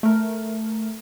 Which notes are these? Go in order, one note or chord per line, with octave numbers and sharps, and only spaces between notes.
A3 A#4